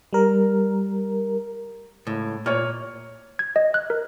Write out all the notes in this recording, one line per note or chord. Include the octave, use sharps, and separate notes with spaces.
G3 A#4
C#2 A2
A#2 C#5 F6
G#6
D#5
F#6
A#4